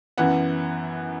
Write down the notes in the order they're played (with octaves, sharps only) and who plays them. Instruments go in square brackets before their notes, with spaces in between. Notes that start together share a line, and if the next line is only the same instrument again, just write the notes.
[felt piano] F#2 E3 B3 F#5